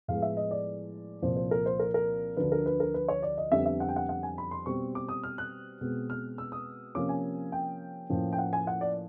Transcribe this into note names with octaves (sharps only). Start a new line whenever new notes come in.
A2 F3 G#3 B3 F5
E5
D#5
D5
C2 A#2 F3 C5
C5
A#4
C5
A#4
A#4
D2 D3 F3 B4
A#4
B4
A#4
B4
C#5
D5
D#5
F2 D3 G3 B3 E5
E5
F#5
G5
F#5
F#5
G#5
B5
C6
B2 G3 C4 C#6
D6
D#6
F6
F#6
B2 G#3 C4
F6
E6
D#6
C3 F3 A#3 C#4 D6
G#5
G5
A2 F3 A#3 C#4
G5
F#5
G#5
F#5
D5